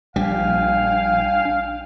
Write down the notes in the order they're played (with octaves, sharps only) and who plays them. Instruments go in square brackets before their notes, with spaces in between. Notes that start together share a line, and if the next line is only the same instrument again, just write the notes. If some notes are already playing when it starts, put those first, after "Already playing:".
[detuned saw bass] A#1 [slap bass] G3 [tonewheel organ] D4 G5 G#5 [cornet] F5